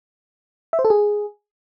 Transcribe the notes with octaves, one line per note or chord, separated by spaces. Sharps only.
E5
C5
A4
G#4